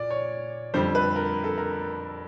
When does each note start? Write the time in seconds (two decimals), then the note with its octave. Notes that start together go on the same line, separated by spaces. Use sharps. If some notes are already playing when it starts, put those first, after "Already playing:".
Already playing: A#2 D5
0.10 C#5
0.74 F2 D3 G3 C5
0.95 B4
1.16 A#4
1.44 A4
1.58 A#4